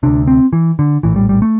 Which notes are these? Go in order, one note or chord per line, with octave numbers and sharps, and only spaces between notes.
D2 C3 D4
C4
E3
D3
A#1 A2 E3
G3
G3
A3